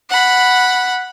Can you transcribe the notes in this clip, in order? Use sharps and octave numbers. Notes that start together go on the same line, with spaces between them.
F#5 B5